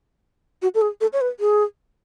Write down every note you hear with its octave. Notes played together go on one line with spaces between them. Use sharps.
F#4
A4
G#4
A4
C#5
B4
G#4